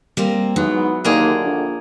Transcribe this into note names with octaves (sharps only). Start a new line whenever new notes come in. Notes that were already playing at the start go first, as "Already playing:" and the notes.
G3 A#3 C4
G#2 E3 F#3 B3
D#2 A2 D3 A#3 G#4
A#1